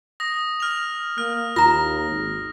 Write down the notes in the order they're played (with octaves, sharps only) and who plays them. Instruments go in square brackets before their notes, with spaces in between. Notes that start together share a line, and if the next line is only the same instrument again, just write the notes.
[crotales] D#6 A#6
F6 F7
[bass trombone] A#3 [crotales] F6
[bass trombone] D#2 [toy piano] F4 A#5 [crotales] A#6
[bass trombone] G#1